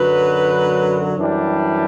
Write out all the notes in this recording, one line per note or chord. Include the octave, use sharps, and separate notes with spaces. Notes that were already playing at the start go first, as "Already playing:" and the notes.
Already playing: F#2 D3 F#3 B4
F#2 E3 G3 D4